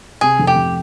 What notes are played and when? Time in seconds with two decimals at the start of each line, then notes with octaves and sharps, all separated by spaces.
0.21 C3 G#4
0.39 F1
0.47 G4
0.56 F1